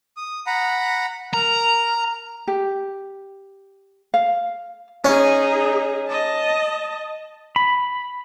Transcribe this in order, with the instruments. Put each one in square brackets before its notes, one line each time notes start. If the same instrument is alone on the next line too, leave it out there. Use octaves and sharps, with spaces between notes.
[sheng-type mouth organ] D#6
F#5 A#5 B5
[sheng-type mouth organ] A#4 [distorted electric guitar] A#5
[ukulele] G4
F5
[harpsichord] C#4 [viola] D#4 G#4
[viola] D#5 A5
[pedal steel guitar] B5